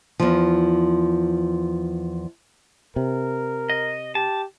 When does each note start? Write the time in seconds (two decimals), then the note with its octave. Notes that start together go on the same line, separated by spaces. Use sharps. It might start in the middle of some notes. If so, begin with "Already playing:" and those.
0.20 E2 F3
2.96 C3 A#4
3.70 D#5
4.15 G4 A5